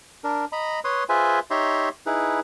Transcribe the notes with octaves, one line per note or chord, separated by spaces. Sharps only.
D4 A#4
D#5 A#5 B5
B4 C#5 C6 D#6
F4 G#4 B4 C5 E5 G#5
D#4 G4 C#5 E5 A#5 C6
D#4 E4 G#4 B4